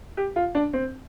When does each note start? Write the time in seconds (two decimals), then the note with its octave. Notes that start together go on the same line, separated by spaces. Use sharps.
0.17 G4
0.36 F4
0.55 D4
0.73 C4